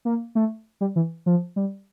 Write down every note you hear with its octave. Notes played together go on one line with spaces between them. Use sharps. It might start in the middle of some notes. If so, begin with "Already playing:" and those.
A#3
A3
G3
E3
F3
G3